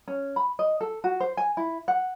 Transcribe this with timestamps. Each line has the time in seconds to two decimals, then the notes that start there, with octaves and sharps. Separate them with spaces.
0.08 C#4
0.36 B5
0.59 D#5
0.81 A4
1.04 F#4
1.20 C5
1.37 G#5
1.57 E4
1.88 F#5